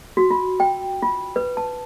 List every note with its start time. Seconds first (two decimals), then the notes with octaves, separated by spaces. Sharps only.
0.17 F#4
0.30 F4
0.60 G5
1.02 F4
1.36 B4
1.57 A5